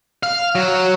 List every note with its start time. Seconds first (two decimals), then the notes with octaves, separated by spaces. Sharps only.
0.23 F5
0.55 F#3